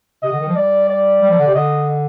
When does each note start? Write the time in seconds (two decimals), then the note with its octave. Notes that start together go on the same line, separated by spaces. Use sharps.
0.23 C3 D#5
0.31 D3
0.40 D#3
0.48 F3
0.56 G3 D5
0.90 D5
1.22 G3
1.30 F3
1.39 D3
1.47 C3
1.55 D3 D#5